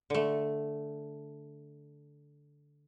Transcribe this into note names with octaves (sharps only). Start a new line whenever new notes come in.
D3 A3